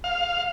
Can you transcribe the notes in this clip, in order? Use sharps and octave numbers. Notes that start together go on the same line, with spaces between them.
F5